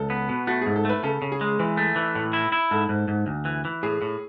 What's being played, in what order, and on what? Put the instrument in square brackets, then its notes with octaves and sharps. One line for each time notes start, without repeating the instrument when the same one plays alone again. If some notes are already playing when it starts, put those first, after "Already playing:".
Already playing: [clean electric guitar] C#2 [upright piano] A4
[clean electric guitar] B3
B2
[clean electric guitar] A3 [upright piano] F#4
[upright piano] G#4
[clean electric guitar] G#2
[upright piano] A4
[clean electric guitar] A3 [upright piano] B4
[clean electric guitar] C#3 [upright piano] A4
[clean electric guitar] C#3
[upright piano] G#4
[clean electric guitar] G#3
[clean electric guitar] E3 [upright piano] B4
[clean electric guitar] A3
E3
A2
E4
E4
[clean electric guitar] G#2 [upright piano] A4
[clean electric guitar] G#2
G#2
D2
E3
E3
[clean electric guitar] A2 [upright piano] G#4
[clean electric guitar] A2